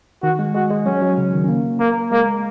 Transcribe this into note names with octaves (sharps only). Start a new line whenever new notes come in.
D#3 F#4
G#3
G#3 F#4
G#3
F#3 C#4
F#3
C#3
D#3
C#4
A#3
A#3
G#3 A#3